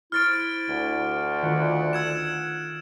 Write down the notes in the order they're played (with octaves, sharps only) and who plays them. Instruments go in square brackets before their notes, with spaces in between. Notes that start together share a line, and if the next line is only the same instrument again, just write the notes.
[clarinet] E4 [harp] C5 C#6 E6 [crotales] F6 A6 D7
[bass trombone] D2
[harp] D#3 F4 B4 [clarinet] F#5
[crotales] E6 G#6 E7